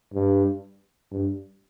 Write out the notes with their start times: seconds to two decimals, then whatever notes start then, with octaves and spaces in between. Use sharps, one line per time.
0.14 G2
1.11 G2